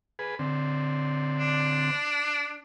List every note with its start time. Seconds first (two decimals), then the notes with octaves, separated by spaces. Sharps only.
0.19 G#4 B4
0.39 D3 C4
1.38 D4